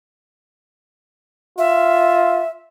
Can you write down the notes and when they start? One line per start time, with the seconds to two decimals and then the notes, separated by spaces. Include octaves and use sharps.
1.58 F4 E5